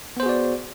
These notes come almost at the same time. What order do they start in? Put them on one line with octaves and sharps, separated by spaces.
B3 C5 G#4 F#4 D5